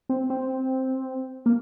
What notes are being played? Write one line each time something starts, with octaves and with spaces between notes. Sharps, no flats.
C4
C4
A#3